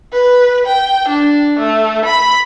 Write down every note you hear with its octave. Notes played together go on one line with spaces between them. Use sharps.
B4
G5
D4
A3
B5